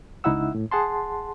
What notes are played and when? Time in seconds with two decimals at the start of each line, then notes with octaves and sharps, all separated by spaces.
0.24 C#2 D#4 E4 E5 F#5 E6
0.55 A2
0.71 G#4 F#5 A5 C6